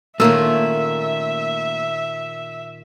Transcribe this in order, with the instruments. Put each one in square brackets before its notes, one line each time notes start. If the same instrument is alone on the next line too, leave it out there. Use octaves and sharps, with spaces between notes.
[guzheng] A#2 D#3 [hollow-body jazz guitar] A3 A#3 C#4 [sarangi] E5 [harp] E6